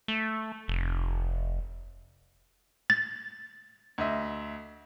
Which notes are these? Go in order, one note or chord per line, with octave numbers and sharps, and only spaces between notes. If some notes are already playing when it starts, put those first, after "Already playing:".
A3
F1
A6
D2 D#5 E5